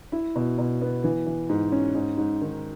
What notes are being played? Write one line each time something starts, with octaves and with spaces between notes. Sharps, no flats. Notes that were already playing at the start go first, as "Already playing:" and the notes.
E4
B2
B2
B3
E3
E3
G#2
C#4
G#2
G#2
D#3